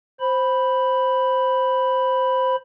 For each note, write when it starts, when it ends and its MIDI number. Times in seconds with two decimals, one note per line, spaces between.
0.20 2.56 72
0.20 2.56 83